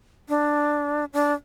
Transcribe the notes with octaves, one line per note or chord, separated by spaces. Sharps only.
D4
D4